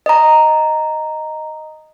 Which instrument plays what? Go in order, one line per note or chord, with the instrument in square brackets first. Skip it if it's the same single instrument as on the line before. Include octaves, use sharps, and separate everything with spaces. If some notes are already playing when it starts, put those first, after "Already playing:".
[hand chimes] D#5 A#5